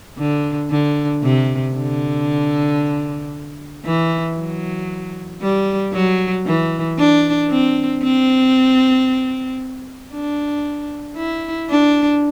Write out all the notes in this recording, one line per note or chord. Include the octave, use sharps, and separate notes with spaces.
D3
D3
C3
D3
E3
F#3
G3
F#3
E3
D4
C4
C4
D4
E4
D4